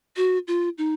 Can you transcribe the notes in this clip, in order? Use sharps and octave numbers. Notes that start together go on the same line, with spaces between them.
F#4
F4
D#4